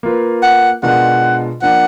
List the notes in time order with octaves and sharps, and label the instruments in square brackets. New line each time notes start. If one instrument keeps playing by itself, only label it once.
[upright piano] A#3 F4 B4
[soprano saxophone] F#5
[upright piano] B2 G#3 D4 F4 A#4 [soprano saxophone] F#5
[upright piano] F3 A#3 D4 [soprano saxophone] F#5